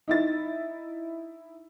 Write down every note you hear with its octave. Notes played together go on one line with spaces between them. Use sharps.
D#4 E4 A6